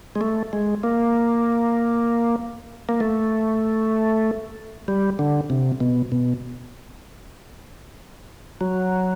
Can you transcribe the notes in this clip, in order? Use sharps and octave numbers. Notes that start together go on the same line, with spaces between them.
G#3
A3
G#3
A#3
A#3
A3
G3
D3
C3
B2
B2
F#3